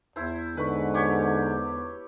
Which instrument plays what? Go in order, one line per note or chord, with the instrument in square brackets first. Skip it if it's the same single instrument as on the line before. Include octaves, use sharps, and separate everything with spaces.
[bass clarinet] E2 [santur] E4 C5
[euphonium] G#2 [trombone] D3 [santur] B4 C#6
[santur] G4 C#5